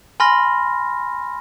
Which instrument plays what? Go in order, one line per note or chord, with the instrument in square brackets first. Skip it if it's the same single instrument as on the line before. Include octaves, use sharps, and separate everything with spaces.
[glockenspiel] G#5 B5 C6 F6 A#6